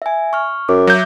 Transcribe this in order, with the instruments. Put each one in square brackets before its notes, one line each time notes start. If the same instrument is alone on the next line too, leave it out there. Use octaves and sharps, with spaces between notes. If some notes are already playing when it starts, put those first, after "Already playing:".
[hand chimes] E5 G#5
C#6 F6
[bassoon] F#2 [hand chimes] D6
[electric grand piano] F#3 G6 [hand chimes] E5